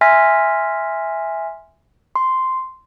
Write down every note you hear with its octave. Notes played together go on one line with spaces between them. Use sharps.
E5 G#5 C6 F6 A#6 B6
C6